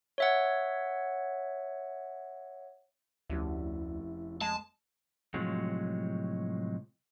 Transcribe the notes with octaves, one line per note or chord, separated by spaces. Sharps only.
C#5 E5 F#5
F1 D2 C3 C#4 E4
G#3 A5
A2 C3 F3 F#3 G#3